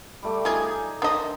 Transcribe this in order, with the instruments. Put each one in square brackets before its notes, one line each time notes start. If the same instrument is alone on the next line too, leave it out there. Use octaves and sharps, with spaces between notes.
[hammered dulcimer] G3 A3 D6
[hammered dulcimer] D#4 G#5 [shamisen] F4 G#4
[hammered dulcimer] D#3 C5 [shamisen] D4 D#5